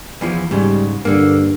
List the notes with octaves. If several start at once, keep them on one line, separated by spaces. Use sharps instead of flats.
E2 E3 F3
G#2 C#3 G3
G2 D3 A#3